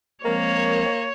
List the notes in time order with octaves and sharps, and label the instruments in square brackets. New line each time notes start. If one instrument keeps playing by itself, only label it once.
[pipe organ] F3 G#3 C4 [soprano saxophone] A#3 [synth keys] A#4 [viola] C#5